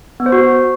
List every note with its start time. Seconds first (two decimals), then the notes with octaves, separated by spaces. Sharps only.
0.20 B3
0.26 C5
0.32 F#4